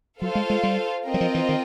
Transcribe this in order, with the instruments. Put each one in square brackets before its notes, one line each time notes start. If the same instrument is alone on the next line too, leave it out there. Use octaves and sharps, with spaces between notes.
[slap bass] F#3 [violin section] F4 A4 C5 F5
[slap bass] G#3
G#3
G3
[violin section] C4 F4 A#4 D#5 G5
[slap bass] F#3
F3
E3
D#3